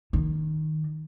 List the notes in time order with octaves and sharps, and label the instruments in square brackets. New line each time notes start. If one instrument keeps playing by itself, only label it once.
[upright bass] D#3